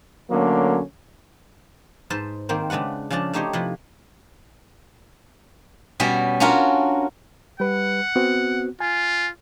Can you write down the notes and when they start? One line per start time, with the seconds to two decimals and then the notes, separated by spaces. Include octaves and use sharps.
0.31 D3 F#3 A3 A#3 C#4
2.10 G#2 B4 C5 A5
2.49 D#3 A#3 C4 C5
2.70 C#3 G#3 D4 B4 F#5
3.10 C#3 F3 C#4 D4 A5
3.33 A3 D#4 G4 C5 C#5 D#5
3.53 C3 F3 E4 B4
6.00 B2 G3 C#4 F#4
6.40 C#4 D4 F4 F#4 A#4
7.60 G3 B4 F#5
8.16 B3 C4 F#4
8.80 F4 G#5